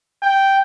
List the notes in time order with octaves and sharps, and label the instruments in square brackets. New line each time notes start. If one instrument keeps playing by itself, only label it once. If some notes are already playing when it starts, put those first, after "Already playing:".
[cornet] G5